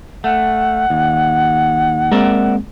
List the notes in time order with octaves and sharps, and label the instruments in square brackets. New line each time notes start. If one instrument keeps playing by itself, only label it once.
[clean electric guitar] A3 [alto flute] F#5
[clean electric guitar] D#2
[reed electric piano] G#3 A#3 C4 [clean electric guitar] A#4 D5 E5